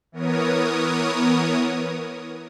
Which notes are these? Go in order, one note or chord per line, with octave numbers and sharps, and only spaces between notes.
E3 B3 A#4 C#5 D#6